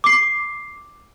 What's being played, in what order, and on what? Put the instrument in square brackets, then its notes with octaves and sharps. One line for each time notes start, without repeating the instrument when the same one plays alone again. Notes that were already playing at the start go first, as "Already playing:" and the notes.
[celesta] D6 C7